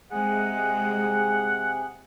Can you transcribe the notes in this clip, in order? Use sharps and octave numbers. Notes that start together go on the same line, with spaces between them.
C3 G#3 G#4 F#5 F#6